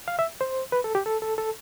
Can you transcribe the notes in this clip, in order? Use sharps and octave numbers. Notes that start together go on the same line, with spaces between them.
F5
E5
C5
B4
A4
G4
A4
A4
A4